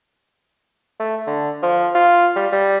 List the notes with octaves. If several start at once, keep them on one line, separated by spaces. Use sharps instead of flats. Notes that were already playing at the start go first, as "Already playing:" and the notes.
A3
D3
F3
F4
G3
G3